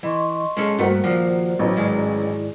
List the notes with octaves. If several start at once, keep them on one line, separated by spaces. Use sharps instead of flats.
E3 D#5 C6 C#6
G#3 C#4 A4
G2 G3 A3 A#3 F#4 A#4 C5 F#5
D#2 F3 A#3 C5 D5
A1 F#3
G#2 D#3 G#3 E4 D5